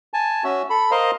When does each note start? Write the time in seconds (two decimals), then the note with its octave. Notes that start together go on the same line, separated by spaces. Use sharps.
0.14 G#5 A5
0.44 C#4 F#4 E5
0.70 A4 B5
0.91 A#4 C5 D#5 F5